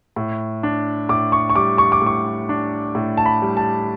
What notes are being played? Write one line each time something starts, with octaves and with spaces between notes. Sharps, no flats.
A2
D4
A2 D6
C#6
C#6
G3 D6
C#6
D6
A2 C#6
D4
A2
A5
B5
G3
A5